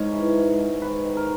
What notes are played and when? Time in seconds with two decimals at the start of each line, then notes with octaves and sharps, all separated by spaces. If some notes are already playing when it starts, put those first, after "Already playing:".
Already playing: G#2 G#3 A#4 C#5
0.12 E3
0.36 G#2
0.59 G#2
0.81 D#3 B4
1.05 D#3
1.17 A#4